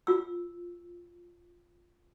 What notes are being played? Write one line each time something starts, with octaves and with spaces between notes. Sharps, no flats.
F4 E6